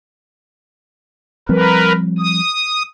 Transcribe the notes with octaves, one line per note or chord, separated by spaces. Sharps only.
F3 G3 C4 A#4 B4
D#6